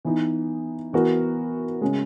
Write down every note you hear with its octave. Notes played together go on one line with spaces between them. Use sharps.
E3 B3 D#4
E3 B3 F#4 A#4
C#3 G#3